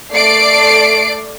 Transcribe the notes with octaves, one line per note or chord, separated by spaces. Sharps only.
A3 D5 C7 D7